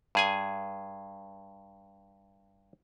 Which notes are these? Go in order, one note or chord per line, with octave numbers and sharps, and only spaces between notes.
G2 G#4 G#5